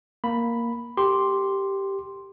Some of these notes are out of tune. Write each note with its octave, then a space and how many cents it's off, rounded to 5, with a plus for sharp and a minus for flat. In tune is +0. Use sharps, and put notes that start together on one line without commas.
A#3 +0 B5 +0
G4 +0 A#4 -45 C6 +0